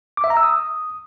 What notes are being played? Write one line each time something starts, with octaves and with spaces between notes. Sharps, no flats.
D6
E5
A#5
E6
D#6